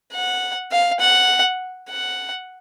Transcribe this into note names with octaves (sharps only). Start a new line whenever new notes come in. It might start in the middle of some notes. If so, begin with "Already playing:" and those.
F#5
F5
F#5
F#5